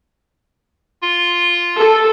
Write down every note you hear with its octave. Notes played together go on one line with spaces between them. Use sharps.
F4
A4